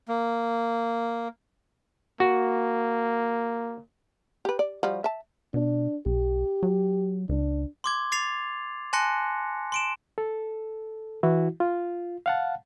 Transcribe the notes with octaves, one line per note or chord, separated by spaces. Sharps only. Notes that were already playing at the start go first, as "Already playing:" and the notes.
A#3
A#3 F#4
G4 B4
D5
F3 G3 F#4
E5 A5
B2 D4
B1 G4
F#3
C#2 D4
C6 D6 G#6
D6 A6 C7 F7
G#5 A5 C6 F#6 A#6 C#7
C6 D7 E7
A4
E3 E4 F#4
F4
F5 F#5 A5